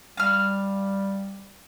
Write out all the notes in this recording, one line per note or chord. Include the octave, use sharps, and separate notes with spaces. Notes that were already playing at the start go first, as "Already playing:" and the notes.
G3 F5 F6